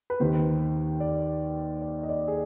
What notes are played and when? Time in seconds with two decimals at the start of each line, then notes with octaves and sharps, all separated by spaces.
0.10 B4
0.20 D#2 D#3 C5
1.00 D5
1.82 D5
2.03 D#5
2.09 D5
2.28 G#4